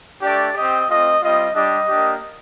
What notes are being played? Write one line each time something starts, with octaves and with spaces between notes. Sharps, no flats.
A3 D4 G4 D5
C4 G4 D#5
A3 C4 F4 D#5
G3 C4 F4 D#5
G3 D4 G4 D#5
A#3 D4 G4